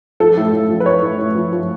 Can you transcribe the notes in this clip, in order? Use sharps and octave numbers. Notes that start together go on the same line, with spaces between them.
F3 A4
A2
A2
F3
B4
F3 C#5
A2
A2
F3
F3